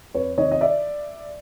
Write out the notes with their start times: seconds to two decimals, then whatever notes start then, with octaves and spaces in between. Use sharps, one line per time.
0.14 F2 B4 C#5
0.37 C3 D#3 C#5 D#5
0.51 D#5
0.61 D5 E5